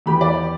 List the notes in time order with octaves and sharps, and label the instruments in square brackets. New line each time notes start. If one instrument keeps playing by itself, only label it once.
[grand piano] E2 E3 B3 G4 [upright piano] B5
[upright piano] D5